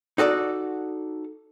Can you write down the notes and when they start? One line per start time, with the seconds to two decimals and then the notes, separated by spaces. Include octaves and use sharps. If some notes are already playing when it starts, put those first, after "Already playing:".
0.18 D#4 F#4 A4 D5